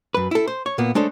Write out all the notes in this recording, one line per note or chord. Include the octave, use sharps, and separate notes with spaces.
F#2 B4
E4 A4
C5
C#5
A#2 A#3 B3
G#3 A3 D4 A4 C5 C#5